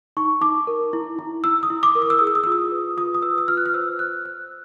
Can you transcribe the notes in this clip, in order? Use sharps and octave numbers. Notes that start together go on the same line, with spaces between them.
D#4 C#6
D#4 D6
A#4
E4
E4
E4 E6
D#6
E4
D6
A#4
D#6
E6
G#4 D#6
E6
D#6
F4 E6
D#6
B4
F4 D#6
D#6
B4 E6
E6
F4 F6
F#6
F6
C5 E6
C5 F#6
C5 F#6